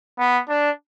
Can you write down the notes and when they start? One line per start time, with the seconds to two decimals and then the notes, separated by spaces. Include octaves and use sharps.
0.19 B3
0.49 D4